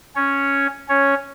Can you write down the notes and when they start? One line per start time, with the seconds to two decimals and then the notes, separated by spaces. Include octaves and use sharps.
0.16 C#4 C#5
0.89 C#4 C#5